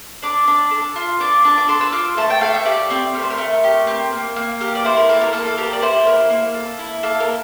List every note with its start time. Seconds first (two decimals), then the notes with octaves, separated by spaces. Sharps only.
0.23 D4 D6
0.48 D4
0.71 A4
0.96 F4
1.20 D4 D6
1.45 D4
1.58 D6
1.68 A4 C6
1.81 E6
1.92 F4 D6
2.17 A3 A5
2.30 G5
2.41 A3 F5
2.54 E5
2.66 G4 D5
2.90 C4
3.14 A3 A#4
3.22 C5
3.30 A#4
3.38 A3
3.64 G4
3.87 C4
4.12 A#3
4.36 A#3
4.61 G4 A#4
4.75 D5
4.85 E4 C5
4.97 A#4
5.09 A#3 A4
5.21 A#4
5.33 A#3 A4
5.45 A4
5.57 G4 A#4
5.73 D5
5.82 E4 C5
6.07 A#3 A#4
6.30 A#3
6.54 A4
6.79 E4
7.03 A#3 A4
7.20 A#4
7.28 A#3